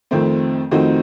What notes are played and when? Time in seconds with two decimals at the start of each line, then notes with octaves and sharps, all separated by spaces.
0.11 F2 D#3 A3 C4
0.71 F2 D#3 A3 C4 D#4 F#4